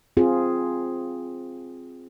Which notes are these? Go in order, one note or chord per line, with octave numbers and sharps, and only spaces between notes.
C4 F4 G#4